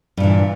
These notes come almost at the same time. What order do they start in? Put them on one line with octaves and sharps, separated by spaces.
G2 A#2 E3